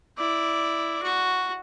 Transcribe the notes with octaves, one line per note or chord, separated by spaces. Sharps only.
E4 D5
F#4